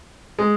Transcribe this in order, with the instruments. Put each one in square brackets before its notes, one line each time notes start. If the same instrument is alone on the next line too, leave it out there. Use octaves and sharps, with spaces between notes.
[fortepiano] G#3